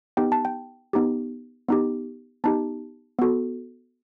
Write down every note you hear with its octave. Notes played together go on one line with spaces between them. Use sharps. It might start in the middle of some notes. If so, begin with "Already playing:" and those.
B3 D#4 G4 G5
A5
G5
B3 D#4 G4
B3 D#4 G4
B3 D#4 G4 A5
B3 F#4 A4